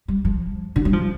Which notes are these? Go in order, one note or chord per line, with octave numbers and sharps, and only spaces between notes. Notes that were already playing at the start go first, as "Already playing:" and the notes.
G3
F3
D3
G3
F3